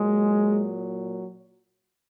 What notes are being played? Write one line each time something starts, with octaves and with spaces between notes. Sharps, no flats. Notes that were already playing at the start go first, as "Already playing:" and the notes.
Already playing: A#2 F#3 G#3